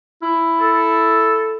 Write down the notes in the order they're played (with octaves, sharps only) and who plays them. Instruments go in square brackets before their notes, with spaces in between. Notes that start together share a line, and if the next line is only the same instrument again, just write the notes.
[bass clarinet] E4
[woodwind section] A4